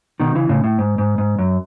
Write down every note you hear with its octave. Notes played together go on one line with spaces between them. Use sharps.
B2 D#3
C#3 E3
A2 C#3
A2
G#2
G#2
G#2
F#2